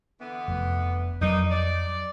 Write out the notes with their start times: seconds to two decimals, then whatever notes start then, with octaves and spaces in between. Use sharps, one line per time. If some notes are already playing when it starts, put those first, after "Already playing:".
0.20 D3 E3 B3
0.48 F1
1.21 F2 F#3 A#3 D4 D#4
1.51 D5